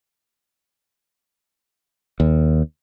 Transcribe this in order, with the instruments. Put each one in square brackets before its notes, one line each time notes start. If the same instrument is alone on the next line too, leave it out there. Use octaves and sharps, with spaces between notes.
[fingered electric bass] D#2